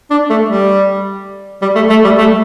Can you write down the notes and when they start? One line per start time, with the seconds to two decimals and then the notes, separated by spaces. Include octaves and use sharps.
0.10 D4
0.30 A3
0.49 G3
1.62 G3
1.76 A3
1.90 A3
2.04 G3
2.18 A3